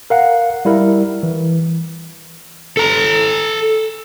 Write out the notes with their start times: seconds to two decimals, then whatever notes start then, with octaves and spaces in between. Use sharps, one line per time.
0.10 A#4 F5 F#5
0.65 G3 E4 A#4
1.23 E3
2.77 A4 A#5